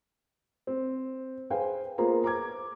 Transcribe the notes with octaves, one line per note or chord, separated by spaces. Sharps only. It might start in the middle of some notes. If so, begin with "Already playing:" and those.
C4
G#4 B4 C5 F5 G5 G#5
A#3 B3 F4 G#4 C5 A#5
A#5 D6 G#6